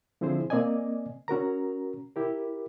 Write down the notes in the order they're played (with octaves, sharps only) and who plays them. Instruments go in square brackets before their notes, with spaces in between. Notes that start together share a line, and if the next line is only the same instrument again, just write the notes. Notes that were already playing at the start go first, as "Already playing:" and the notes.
[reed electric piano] D3 F3 C4 E4 G#4 C5
A#3 C4 D5 D#5 G#5
C#4 F#4 A#4 A#5
E4 G4 A#4